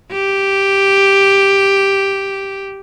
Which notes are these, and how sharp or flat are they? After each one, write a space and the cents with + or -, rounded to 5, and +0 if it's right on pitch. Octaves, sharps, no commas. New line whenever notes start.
G4 +0